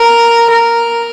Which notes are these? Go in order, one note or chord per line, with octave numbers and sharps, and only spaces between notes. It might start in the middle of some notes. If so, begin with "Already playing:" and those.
Already playing: A#4
A#4